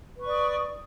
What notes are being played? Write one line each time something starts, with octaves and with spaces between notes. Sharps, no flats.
B4 D5 C#6 D#6